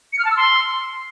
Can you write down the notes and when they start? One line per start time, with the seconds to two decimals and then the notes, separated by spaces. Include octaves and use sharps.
0.13 C#7
0.19 F6
0.25 A5
0.31 E6
0.37 C6